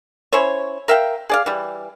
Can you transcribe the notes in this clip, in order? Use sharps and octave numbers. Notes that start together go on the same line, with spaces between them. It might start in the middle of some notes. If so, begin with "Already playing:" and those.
C#4 E4 C5 C#5
A#4 E5 F5 G5
G#4 D5 F5
E3 G3